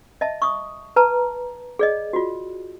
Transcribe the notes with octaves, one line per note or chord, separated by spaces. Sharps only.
D#5 E5 A5
C#6 D#6
B4 A5 A#5
G#4 D5 D#5
F4 F#4